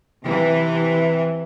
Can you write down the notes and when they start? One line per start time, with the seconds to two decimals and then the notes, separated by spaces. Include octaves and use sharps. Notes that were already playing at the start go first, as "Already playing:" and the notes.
0.25 C3 E3